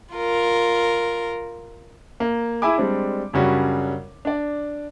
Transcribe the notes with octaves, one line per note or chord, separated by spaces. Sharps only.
F4 A#4
A#3
E4 G#4 E5 G#5 B5 D6
G3 G#3 C4 D4
F#2 C#3 G3 C#4 D4 F#4
D4 D5